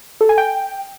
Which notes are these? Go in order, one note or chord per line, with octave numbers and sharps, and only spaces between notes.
A4
G#5
G5